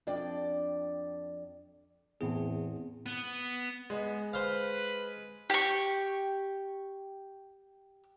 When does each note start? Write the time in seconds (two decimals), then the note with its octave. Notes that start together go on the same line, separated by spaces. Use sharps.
0.07 F2 D4 D5 G5
2.21 E2 A2 C4 G#4
3.06 B3
3.90 G#3 B3
4.33 B4 C5 F5
5.50 G4 C#6